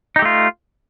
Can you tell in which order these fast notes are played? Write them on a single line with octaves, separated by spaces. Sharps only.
D#4 G4 A3 F4